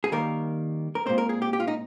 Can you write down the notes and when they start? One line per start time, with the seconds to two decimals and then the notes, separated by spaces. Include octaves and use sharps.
0.04 G#4
0.12 D#3 G3 A#3 A#4
0.95 A#4
1.06 A#2 G#3 C4 C5
1.18 A#4
1.29 G#4
1.42 G4
1.53 G4
1.60 F4
1.68 D#4